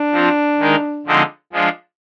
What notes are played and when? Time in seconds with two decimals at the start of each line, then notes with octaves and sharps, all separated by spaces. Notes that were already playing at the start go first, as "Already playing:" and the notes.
Already playing: D4
0.12 F3 C4 F4
0.59 D#3 G#3 D#4 A#4
1.07 D3 F3 G#3 C4 D#4
1.53 F3 G#3 D4 F4